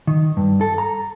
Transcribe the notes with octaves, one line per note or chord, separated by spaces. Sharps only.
D#3
G2
A4
A#5